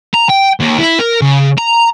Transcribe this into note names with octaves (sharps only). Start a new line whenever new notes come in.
A#5
G5
D#2
E4
A#4
C#3
A#5